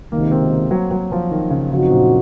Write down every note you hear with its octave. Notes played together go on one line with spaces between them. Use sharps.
C#2 C3 D#3 A#3
C4
F#3
F#3
F3
D#3
C#3
F#2 C#3 F3 C4 D#4 F#4
A#2